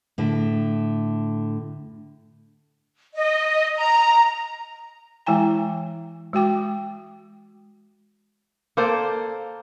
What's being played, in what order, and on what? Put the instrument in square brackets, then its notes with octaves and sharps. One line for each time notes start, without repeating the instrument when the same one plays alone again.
[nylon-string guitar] A2 D3
[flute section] D#5
A#5
[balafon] E3 G#3 E4 G5 G#5 A#5
G#3 F#4 G5 D6
[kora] A#3 A4 C5 D5